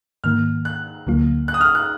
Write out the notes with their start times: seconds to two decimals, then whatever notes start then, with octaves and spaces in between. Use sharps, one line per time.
0.24 G#2 D#3 A#3 F6
0.65 F#6
1.07 D2 D3 F#3 A#3 F4
1.48 F#6
1.54 D#6
1.61 F6
1.75 F#6